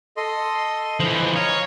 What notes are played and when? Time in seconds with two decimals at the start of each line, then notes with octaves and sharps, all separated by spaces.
0.17 A4 D#5 C6
1.00 E3 F3 C5 D#5
1.36 C#5 F5 A#5 D#6